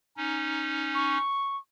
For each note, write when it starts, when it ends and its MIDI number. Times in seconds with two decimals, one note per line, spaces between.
0.17 1.18 61
0.17 1.18 63
0.95 1.57 85